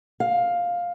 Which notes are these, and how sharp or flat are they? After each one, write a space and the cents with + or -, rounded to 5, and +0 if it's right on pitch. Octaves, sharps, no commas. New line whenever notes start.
F5 +10